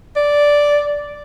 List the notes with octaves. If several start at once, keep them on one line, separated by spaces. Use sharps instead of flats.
D5